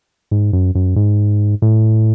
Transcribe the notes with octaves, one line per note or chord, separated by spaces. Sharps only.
G#2
F#2
F#2
G#2
A2